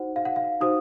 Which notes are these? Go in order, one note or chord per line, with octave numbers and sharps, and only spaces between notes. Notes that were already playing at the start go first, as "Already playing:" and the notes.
Already playing: D#4 F#4 C5 F#5
F5
F#5
F5
D#4 F#4 C5 D#6